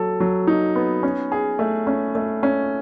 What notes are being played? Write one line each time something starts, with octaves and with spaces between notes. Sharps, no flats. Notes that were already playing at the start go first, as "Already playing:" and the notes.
Already playing: F#3 A4
F#3
D#4
B3
C#4
G#4
A3
C#4
A3
C#4